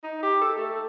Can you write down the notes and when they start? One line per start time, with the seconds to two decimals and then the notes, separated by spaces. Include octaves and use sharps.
0.03 D#4
0.23 G4
0.41 A4
0.58 A3